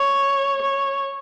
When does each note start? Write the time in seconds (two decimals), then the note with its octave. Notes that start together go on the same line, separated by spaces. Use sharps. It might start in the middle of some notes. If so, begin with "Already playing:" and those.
Already playing: C#5
0.62 C#5